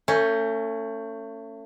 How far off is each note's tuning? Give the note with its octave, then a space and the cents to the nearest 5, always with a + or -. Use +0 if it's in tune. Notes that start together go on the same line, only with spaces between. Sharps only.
A3 +35 C#4 +0